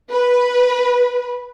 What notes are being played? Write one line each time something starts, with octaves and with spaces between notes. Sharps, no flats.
B4